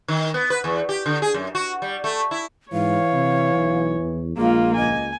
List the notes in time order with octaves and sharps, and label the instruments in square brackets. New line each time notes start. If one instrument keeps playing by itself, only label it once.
[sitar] D#3
B3
B4
E2
G4
D3
G#4
F#2
F#4
G3
A3
E4
[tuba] G#2 [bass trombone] E3 [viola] C#5 [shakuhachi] F5
[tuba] C3
B1
E2
[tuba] A#1 [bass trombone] G#3 [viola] A#3 F4 [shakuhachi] F5
[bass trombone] C#2 [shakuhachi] D#5 [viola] G#5